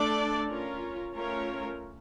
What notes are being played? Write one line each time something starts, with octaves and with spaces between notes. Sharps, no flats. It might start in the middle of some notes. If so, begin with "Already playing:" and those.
Already playing: A3 D4 A4 D5
C#4 F4 A#4 C#5
A3 C#4 F4 A#4 C#5